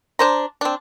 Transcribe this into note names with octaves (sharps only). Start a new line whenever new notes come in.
D4 C5 A#5
C4 D4